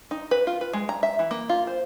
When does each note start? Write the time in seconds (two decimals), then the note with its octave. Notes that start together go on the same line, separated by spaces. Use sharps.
0.11 D#4
0.31 B4
0.47 F4
0.61 B4
0.73 G#3
0.89 A#5
1.03 E5
1.19 E3
1.31 A#3
1.49 F4
1.67 C5